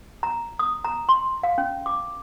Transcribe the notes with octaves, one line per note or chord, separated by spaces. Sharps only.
A#5
D#6
A#5
C6
F5
C#4
D6